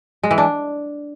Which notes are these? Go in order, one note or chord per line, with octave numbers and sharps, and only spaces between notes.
G#3
E3
D4